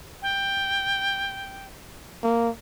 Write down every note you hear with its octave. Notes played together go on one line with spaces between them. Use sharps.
G5
A#3